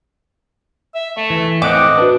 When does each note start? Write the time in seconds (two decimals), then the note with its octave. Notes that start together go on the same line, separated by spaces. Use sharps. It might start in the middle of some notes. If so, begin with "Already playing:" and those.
0.95 E5
1.17 A3 E5
1.30 E3
1.62 A2 C4 D#5 F#5 D6
1.98 D4 F#4 B4